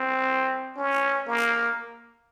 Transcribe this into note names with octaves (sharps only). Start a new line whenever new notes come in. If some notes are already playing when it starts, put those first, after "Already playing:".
Already playing: C4
C#4
A#3